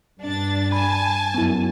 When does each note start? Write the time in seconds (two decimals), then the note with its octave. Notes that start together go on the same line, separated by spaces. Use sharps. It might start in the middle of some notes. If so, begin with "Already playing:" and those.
0.21 G2 D4 A6
0.72 G#5 A5 B5
1.34 F#2 B3 E4